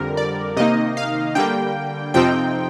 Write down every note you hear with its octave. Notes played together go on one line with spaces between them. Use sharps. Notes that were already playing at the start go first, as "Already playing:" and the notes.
Already playing: F2 D3 G3 A#4
D5
C3 D#3 A#3 D#4 D#5
F5
D3 G3 A#3 G5
F2 C3 F3 C4 D#4 G5